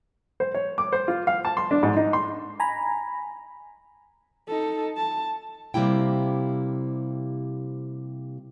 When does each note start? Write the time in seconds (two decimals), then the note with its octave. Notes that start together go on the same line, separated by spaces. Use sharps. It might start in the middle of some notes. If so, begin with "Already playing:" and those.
0.40 C5
0.54 C#5
0.78 D6
0.93 C5
1.08 F4
1.27 F5
1.45 A5
1.57 C6
1.71 D4
1.83 G#2
1.97 D#4
2.13 C6
2.60 G#5 A#5 B5
4.47 D#4 A4
4.97 A5
5.74 C3 G3 A#3 E4 G5